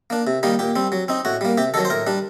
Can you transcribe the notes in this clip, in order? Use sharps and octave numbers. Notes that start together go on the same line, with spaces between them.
A#3 D4
C3
D#3 G3 A#3 D#4
A#2 G4
G3 C4
F#3
C4 D#4
A2 F#4
G3 A#3
C3 G4
D#3 F#3 A4
C5
A2 A#4
G3 D4